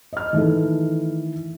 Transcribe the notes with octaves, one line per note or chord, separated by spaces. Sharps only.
D#5 F6
D#3 E3 A3 A4